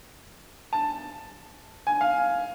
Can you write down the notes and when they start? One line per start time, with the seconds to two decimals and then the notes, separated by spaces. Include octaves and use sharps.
0.73 A5
1.87 G#5
2.01 F5